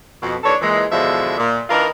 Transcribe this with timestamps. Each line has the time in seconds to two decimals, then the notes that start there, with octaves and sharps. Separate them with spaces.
0.23 F2 B2
0.44 D#2 E3 D4 A4 C#5
0.61 A#2 E3 G#3
0.92 E2 B2 D3 F3 G#3 E5
1.38 A#2
1.70 E3 D4 D#4 F4 A#4